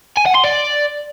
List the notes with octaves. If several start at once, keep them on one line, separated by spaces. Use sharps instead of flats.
G#5
F#5
C6
D5